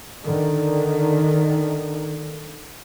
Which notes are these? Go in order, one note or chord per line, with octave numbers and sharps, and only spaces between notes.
D3 D#3